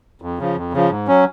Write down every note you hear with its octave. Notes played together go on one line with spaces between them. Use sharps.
F2
C#3 F3
F2
C#3 F3
G#2
F#3 C#4